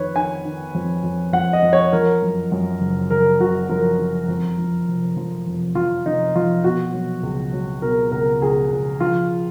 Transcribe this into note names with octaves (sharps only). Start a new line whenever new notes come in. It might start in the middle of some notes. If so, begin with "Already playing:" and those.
Already playing: F2 D#3 B4 C#5
D#3 G#5
D#3
F2
F2
F2 F#5
D#5
F2
C#5
F3 A#4
F#2
F#2
F#1
F#1 A#4
F#1 F#4
F3 A#4
F3
F2
F3
F1
F3
F1
F3 F4
F1 D#4
F3 F4
B2 F#4
F#3
C#2
F#3
B2 A#4
C#2 A#4
C#2 G#4
C#2
F3 F4